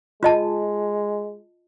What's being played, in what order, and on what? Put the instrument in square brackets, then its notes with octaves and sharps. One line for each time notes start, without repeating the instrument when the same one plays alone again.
[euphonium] G#3 [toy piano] F4 D#5 A5